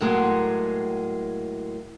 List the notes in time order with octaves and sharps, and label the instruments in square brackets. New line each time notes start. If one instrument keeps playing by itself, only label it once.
[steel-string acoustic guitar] A2 F#3 G#3 A#3